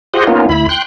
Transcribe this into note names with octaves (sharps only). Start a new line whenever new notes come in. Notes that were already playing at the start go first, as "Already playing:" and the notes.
F4 G4 G#4 C5 D#5 F#5
A#3 B3 C#4 D#4 F4
D2 E4 B5
G5 C6 F#6